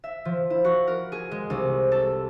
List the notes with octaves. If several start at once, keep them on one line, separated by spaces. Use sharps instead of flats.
E5
F3
E4
F#4
A#4
G#4
G#3
C2
A4